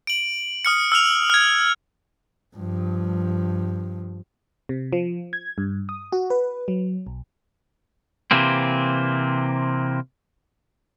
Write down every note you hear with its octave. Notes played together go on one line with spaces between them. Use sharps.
D7 F#7
D#6 F6 C#7
E6 F6 F7
F6 G#6
G2 F3
C3
F3
G#6
G2
D#6
F#4
B4
F#3
B1
C3 E3 A#3 C4